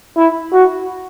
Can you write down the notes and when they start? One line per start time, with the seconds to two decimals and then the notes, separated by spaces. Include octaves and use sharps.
0.17 E4
0.53 F#4